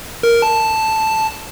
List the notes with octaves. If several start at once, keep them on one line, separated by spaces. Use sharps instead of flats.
A#4
A5